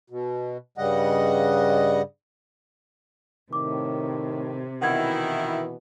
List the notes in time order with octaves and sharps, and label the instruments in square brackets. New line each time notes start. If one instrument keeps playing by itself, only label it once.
[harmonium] B2
G2 C#3 G3 D#5 F#5
[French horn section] A2 D#3 [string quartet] C3 [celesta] D6
[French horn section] B2 E3 B3 [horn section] D#3 E4 [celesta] F#5 G#6